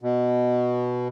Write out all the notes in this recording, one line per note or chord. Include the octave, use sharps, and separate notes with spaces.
B2